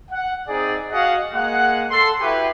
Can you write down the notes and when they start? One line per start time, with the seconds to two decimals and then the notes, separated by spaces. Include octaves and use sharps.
0.11 F#5
0.48 C4 D#4 G#4 D5
0.91 F#4 G#4 D#5 F5 F#5
1.33 G#3 A#3 F#5
1.91 A4 C6
2.21 E4 F#4 G4 B4